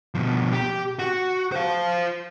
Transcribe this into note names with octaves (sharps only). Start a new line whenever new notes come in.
B2 F3
G4
F#4
C5 F5